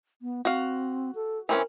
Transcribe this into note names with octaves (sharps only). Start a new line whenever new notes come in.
B3
C4 F#4 F5
A4
E3 C4 C#4 A#4